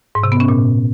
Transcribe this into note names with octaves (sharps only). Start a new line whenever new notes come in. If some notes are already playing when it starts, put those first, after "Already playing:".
G#2
C3
B3
C#4
A#2